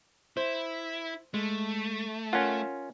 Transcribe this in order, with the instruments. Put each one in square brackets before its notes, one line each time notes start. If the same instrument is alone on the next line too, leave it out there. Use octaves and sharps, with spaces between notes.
[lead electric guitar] E4 [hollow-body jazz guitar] C5
[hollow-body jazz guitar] G#3 [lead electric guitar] A3
[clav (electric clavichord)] C#4 F4 [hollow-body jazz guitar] A#4 F#5